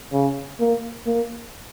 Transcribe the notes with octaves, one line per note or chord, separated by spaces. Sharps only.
C#3
A#3
A#3